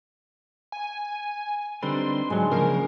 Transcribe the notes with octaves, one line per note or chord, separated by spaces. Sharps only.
G#5
D3 G3 C4 D#4 B4 C6
G#2 F#3 G#3 D4
C#3 F3 A#3 G#4 A#4